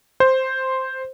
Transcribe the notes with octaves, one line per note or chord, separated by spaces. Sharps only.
C5